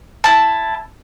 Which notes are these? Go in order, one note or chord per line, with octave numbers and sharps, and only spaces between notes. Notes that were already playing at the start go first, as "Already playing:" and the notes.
E4 A5